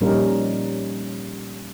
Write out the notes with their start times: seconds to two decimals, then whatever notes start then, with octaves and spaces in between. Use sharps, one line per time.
0.01 A#2 F3 G3 C#4 D#4 A#4